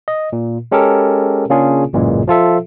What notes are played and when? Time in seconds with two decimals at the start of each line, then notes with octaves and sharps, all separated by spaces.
0.08 D#5
0.33 A#2
0.72 G#3 C#4 G4 A4 A#4
1.50 C#3 A#3 C#4 D4 F4 G#4
1.93 A1 F#2 A#2 C#3 E3 G#3
2.27 F3 F4 A4 E5